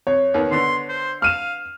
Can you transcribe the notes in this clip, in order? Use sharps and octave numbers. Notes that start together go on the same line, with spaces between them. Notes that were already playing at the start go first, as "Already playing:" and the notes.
F2 C#5
D#2 D#3 B3
D3 B3 D4 C6
C5
F5 F6 D#7 E7